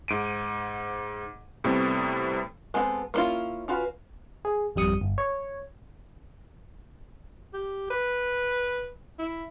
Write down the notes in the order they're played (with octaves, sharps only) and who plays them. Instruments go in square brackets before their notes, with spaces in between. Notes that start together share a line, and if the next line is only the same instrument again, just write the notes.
[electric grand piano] G#2 D7 D#7
A2 C3 G3 A3 B3 C4
[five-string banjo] G#3 B3 C4 E4 A4
A#3 B3 C#4 E4 F4
C#4 F4 F#4 B4
[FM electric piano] G#4
G#1 F2 G3 D#6 C#7
G1
C#5
[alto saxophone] G4
B4
E4